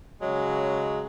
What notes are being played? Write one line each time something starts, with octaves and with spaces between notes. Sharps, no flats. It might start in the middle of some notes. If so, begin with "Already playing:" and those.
C#3 F#3 G#3